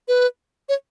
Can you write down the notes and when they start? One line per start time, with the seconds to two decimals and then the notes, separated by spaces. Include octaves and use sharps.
0.08 B4
0.69 C#5